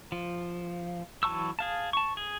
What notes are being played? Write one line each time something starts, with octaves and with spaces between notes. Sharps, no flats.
F3
E3 F#3 A5 C#6 E6
G#4 F5 A5
A5 C#6
G#4